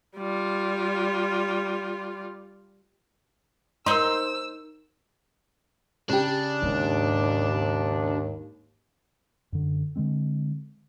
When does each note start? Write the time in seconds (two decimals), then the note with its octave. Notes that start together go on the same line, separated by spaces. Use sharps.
0.17 G3 F4
3.86 D#4 A#4 C5 C6 E6
6.10 C#3 D4 G4
6.63 D#2 G#2
9.52 F#2 D3
9.96 D3 E3 G#3 C4